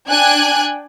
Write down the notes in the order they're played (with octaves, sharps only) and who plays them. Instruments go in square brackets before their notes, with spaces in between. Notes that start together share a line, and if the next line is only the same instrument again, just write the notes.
[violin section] D4 G5 G#5 F#6 G#6